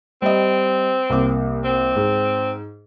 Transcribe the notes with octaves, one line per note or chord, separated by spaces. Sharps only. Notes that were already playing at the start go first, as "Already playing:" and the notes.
G3 C4 D#5
C2 A#3 D6
C4
G#2